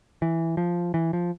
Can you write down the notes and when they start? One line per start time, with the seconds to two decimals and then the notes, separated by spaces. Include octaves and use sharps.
0.22 E3
0.57 F3
0.94 E3
1.13 F3